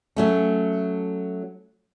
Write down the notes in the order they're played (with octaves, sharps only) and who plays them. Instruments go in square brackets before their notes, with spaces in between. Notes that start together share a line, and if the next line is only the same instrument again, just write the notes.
[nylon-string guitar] F#3 A3 C#4